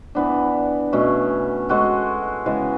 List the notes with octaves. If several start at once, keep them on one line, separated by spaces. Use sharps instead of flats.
E3 B3 D4
B2 A3 C#4
G#3 C#4 F#4 A4
C#3 E3 G#3